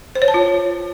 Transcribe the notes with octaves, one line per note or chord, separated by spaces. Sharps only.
C5
C#5
A5
F4